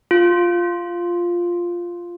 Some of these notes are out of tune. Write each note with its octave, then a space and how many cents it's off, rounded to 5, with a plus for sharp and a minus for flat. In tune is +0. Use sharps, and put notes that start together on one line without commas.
F4 +0